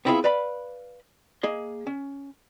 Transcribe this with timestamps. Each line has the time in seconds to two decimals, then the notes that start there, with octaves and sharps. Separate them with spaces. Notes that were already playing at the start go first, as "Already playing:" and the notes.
0.05 B3 C4 E4 F4 G#4 F5
0.24 B4 D5 F5 B5
1.43 A#3 G#4 D#5
1.87 C#4